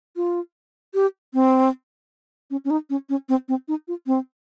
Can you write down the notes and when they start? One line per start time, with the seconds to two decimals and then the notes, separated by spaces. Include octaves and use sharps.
0.16 F4
0.94 G4
1.34 C4
2.51 C#4
2.65 C#4
2.70 D#4
2.90 C#4
3.09 C#4
3.29 C4
3.48 C4
3.68 D#4
3.88 F4
4.07 C4